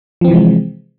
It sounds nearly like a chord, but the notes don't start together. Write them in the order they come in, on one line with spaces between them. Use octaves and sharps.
F3 C4 E3 C3 G#3